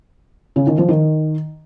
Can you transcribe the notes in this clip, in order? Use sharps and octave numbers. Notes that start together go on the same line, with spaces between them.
C#3
D#3
F3
D#3